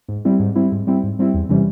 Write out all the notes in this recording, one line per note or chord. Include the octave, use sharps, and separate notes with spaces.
G#2
G3 C4 E4
G#2
G3 C4 E4
G#2
G3 C4 E4
G#2
G3 C4 E4
E2
C3 E3 G3 C#4